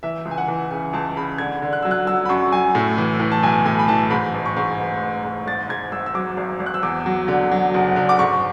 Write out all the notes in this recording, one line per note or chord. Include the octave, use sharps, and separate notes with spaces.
E3 E5
C#2
G#5
F#5
E3
C#3 G#5
C#2 A5
C#3 B5
D3 G#6
D3
F#6
F#3 E6
F#6
F#3 E6
B5
F#2 C#6
F#2 G#5
A2
E3
E3
A5
B1 G#5
A2 G#5
B5
E3 A5
G#2 B5
A1
C#6
G#2
A1
A1
G#2
G#1 A6
G#2 G#6
G#1 E6
E6
F#3 D6
G#1
G#1
F#6
E6
E2 D6
F#3
D3
F#3
F#1
D3
D6
G#2 C#6